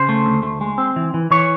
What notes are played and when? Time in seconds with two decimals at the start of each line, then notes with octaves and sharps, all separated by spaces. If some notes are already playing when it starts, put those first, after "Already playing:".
Already playing: C#3 C5
0.09 A3
0.26 D2
0.43 A3
0.61 G#3
0.78 C4
0.96 E3
1.14 E3
1.31 E3 C#5